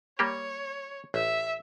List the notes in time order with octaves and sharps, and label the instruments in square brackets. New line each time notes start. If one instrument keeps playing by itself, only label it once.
[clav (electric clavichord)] G3 A#3 G4 [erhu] C#5
[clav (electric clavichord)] A1 [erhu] E5